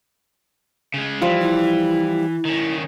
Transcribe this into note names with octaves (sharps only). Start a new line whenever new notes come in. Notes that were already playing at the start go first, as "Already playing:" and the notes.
C#3 G#3
E3 F3 G3 F4
E4
D#3 C#4